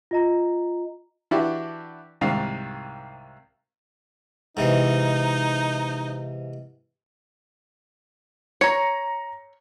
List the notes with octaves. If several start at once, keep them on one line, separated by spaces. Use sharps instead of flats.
F4 D#5 A#5
E3 D4 E4 F#4 G4
C2 G#2 D#3 F5
G#2 C3 E3 D#4
C#5 A#5 C#7